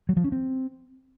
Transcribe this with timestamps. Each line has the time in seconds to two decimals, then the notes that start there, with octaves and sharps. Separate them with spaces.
0.09 F#3
0.17 F3
0.24 C#4
0.32 C4